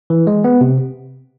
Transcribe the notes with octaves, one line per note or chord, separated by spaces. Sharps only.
E3
G#3
B3
C3